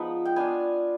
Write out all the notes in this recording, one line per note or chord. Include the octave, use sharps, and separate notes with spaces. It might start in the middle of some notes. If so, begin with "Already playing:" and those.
Already playing: F3 G#3 B3 D#4 F4 B5
G5
B3 D4 F4 G#5